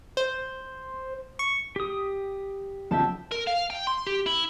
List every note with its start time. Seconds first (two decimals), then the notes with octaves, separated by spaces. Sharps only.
0.17 C5
1.39 C#6
1.76 G4 D#6
2.91 B1 C#3 F3 E5 G5 A5
3.31 A#4
3.47 F5
3.70 G5
3.87 C6
4.07 G4
4.26 E4